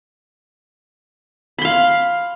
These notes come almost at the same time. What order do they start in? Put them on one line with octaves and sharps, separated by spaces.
B5 C6 F5